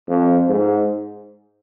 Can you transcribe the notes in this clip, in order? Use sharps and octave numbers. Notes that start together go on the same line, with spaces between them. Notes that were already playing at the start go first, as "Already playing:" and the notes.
F2
G#2